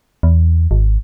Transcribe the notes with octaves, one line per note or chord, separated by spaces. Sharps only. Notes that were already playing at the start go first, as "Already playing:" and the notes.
E2
G#1